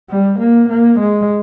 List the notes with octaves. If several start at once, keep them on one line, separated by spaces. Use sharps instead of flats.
G3
A#3
A#3
G#3